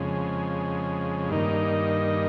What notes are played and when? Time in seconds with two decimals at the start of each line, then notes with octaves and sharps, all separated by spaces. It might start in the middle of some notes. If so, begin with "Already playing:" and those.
Already playing: F2 C#3 G#3
1.29 G2 D#3 A#3 D#4